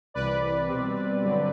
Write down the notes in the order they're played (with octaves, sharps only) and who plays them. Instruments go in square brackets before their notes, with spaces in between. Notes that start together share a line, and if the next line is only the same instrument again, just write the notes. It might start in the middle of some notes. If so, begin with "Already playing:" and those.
[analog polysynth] C2 C3 E3 B4 D5
B2 G3 C4
G2 D3 F#3 C4